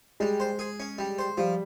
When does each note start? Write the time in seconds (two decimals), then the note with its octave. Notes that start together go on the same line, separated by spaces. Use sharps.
0.20 G3 G#3
0.40 C5
0.59 G#4
0.80 C#4
0.98 G3
1.19 C5
1.38 F3 G3